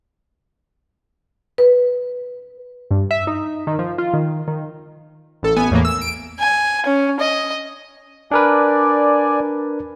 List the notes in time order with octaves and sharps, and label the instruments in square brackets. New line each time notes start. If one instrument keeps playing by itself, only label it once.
[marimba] B4
[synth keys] G2
E5
D#4
D#3
F3
F4
D#3
D#3
[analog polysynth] A1 A4
A1 B3 G#5
E2 A2 E3 A#3
E6
D7
[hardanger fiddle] G#5
C#4
D#5
[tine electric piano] D4 A#4 B4 [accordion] D5 G#5